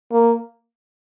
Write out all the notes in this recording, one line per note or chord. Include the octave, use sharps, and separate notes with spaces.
A#3